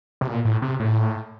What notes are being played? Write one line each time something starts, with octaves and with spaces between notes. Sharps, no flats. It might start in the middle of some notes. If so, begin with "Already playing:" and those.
C3
A#2
A2
C3
A2